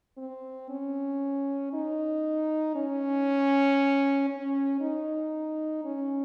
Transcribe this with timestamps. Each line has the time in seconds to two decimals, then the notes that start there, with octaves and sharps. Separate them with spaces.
0.18 C4
0.70 C#4
1.73 D#4
2.75 C#4
4.30 C#4
4.81 D#4
5.85 C#4